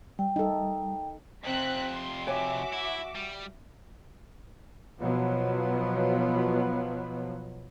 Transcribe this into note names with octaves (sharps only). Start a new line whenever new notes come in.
G3 G5
D#4 A4
F2 C3 C4 F#6 B6
C6
F#4 B4 C#5 E5 G#5 D6
E4
G3
B2 F3 F#3 B3